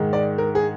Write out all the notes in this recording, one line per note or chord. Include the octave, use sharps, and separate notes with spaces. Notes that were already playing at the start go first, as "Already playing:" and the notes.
Already playing: G#2 D#3 G#3
D5
A#4
G#4